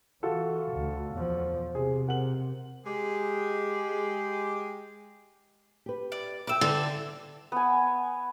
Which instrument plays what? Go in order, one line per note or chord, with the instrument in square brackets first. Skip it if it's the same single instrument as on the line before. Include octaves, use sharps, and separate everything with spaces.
[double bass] E3 [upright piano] F4 F#4 A4
[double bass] D2
E2 F3
[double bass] C3 [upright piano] G#4
[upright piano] A#4 F#5 F#7
[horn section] G#3 G4
[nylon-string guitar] G4 B4
[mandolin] D5
[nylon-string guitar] E5 F#5 G5 [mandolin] D6 E6
[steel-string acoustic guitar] D3
[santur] B3 G#5